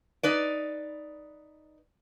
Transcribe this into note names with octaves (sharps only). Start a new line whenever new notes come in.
D#4 B4 D5